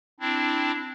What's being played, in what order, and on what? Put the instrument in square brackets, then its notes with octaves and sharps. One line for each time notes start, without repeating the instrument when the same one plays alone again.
[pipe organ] C4 D4 E4